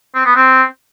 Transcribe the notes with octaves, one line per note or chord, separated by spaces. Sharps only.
C4
B3
C4